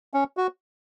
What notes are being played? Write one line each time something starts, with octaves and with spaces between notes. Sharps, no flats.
C#4
F#4